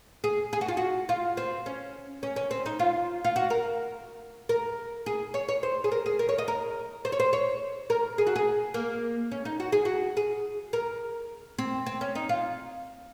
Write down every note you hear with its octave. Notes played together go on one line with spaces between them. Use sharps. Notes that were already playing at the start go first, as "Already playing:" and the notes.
G#4
G#4
F#4
F4
F#4
F4
C4
C#4
C#4
C#4
C4
D#4
F4
F4
F#4
A#4
A#4
G#4
C#5
C#5
C5
G#4
A#4
G#4
A#4
C#5
D#5
A#4
C5
C#5
C5
C#5
A#4
G#4
F#4
G#4
A#3
C#4
D#4
F#4
G#4
F#4
G#4
A#4
C4
C4
C#4
D#4
F4